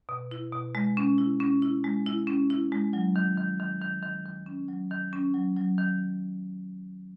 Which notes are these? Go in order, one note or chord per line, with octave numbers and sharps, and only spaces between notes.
B2
E4
B2
G#3
C#4
E4
C#4
E4
G#3
E4
C#4
E4
G#3
F#3
D#3
D#3
D#3
D#3
D#3
D#3
C#4
F#3
D#3
C#4
F#3
F#3
D#3